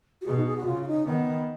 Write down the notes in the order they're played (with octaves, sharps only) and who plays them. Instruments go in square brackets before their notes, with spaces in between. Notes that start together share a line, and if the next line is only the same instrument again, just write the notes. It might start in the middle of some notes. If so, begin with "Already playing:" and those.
[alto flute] F#4
[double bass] B2 [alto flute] G#4
[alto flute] D#4
G#4
F#4
[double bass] C#3 [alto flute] F4
[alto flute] F4
D#4
[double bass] D#3 [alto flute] B3